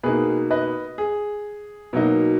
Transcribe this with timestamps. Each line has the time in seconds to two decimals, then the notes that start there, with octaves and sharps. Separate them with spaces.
0.03 B2 A#3 D#4 G#4 B4
0.51 B4 D#5
0.98 G#4
1.93 B2 F#3 A#3 D#4